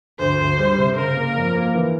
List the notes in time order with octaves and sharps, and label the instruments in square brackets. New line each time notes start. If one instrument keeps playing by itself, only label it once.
[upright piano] D2 [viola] C5
[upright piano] D2
G3
C3
[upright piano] C#3 [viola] A#4
[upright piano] A#3
F2
A#3
E3